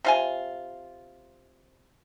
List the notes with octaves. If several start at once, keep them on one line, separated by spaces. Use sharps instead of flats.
C3 F4 G#5